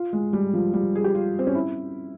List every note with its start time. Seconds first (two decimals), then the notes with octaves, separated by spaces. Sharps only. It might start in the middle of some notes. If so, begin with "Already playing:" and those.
Already playing: F4
0.13 G#3
0.33 G3
0.53 F3
0.74 G3
0.95 G#4
1.04 G4
1.15 F4
1.39 C4
1.47 C#4
1.55 E4